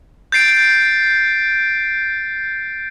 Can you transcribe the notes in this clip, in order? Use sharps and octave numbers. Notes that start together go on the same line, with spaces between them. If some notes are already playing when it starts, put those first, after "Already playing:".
G6 A6 C7 D7